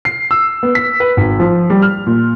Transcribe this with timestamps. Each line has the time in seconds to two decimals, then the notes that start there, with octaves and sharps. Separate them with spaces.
0.05 C7
0.31 E6
0.63 B3
0.75 B6
1.00 B4
1.17 G#1
1.40 F3
1.70 G3
1.82 F6
2.07 A#2